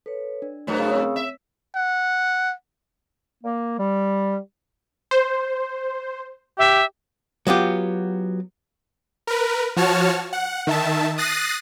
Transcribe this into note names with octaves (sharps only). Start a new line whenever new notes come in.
A4 B4 C#5
D4
G2 F#3 A3 B3 A#4 C5
C#3 C#6
C4 C#5 E6
E5
F#5
A#3
G3
C5
G4 E5
F#3 B3 F4 G4
A#4 B4
F3 F#4 C#5 A5 F6
F#5
D#3 E5 A5
D#6 F#6 A6 A#6 C7 D#7